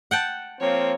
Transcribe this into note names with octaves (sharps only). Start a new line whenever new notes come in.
F#5 G5 A5
F3 A#3 C4 C#5